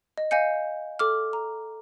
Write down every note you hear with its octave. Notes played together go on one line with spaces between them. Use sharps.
D#5
D#5 F5 G#5 G6 C#7
A4 D6 F6
A#5